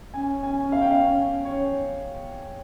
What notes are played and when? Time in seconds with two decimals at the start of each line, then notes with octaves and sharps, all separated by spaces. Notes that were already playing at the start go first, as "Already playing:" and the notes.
0.14 C#4 G#5
0.43 G#5
0.72 F5
0.81 G5
0.91 F5
1.45 C#5